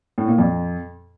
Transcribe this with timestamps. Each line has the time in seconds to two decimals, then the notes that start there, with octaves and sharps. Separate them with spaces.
0.18 A2
0.28 A#2
0.38 F2